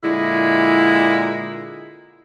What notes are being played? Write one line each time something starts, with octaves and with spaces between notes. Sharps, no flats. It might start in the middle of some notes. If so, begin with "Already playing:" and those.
A#2 D3 G#3 E4